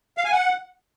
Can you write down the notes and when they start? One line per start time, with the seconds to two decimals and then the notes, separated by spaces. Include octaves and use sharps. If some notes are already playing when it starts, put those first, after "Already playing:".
0.18 F5
0.25 G#5
0.32 F#5